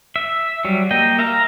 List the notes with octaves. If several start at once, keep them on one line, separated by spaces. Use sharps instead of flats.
E5
F#3 G3
A#3 D#5 G5
E5 F5 A#5